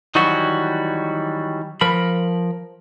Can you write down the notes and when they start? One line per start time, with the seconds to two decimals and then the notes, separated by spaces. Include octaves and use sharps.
0.15 D#3 E3 F#3 G3 F#4
1.81 F3 A#4 B5